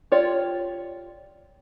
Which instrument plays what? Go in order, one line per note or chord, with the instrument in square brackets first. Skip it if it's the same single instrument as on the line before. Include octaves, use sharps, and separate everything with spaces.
[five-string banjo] F4 G4 C#5 D5